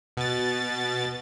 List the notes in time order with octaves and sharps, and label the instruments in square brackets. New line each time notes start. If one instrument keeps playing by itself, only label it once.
[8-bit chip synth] B2 A6